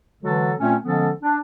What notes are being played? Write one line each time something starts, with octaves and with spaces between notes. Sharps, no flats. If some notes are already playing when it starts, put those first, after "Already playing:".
D3 E3 F#3 G#3 F#4 A4
A#2 A3 C4 C#4
D3 F3 G#3 B3 C#4 A4
D4